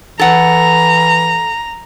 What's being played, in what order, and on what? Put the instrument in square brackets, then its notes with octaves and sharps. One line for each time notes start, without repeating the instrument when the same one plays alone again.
[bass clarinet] E3 [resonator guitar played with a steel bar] A4 F#5 [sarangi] A#5